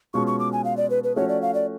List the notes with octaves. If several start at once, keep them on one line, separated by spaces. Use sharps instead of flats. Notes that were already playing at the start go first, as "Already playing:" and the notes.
B2 G#3 C#4 F4 C#6
C#6
D6
G#5
F5
D5
B4
B4
F3 A3 C#4 F#4 C#5
D5
F5
D5